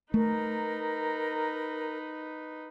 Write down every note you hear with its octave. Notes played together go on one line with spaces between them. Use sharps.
A3 D#4 A#4 B4